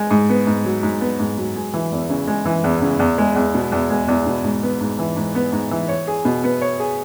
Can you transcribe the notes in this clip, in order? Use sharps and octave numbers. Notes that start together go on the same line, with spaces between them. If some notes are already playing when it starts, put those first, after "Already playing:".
Already playing: G#3
G#2
B3
G#2
F#3
G#2
B3
G#2
F#3
G#3
E3
E2
C#3
G#3
E3
E2
C#3
E2
G#3
E2
B2
E2
G#3
E2
B2
G#2
B3
G#2
E3
G#2
B3
G#2
E3
C#5
G#4
B2
B3
C#5
G#4